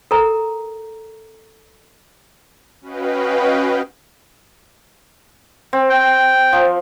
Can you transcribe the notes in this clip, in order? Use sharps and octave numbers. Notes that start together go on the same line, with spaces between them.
A4 A#4 A#5
C#4 F#4 B4 D#5 F5 G5
C4
G5
F3